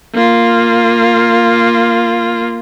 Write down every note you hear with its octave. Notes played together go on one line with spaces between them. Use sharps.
A#3 F4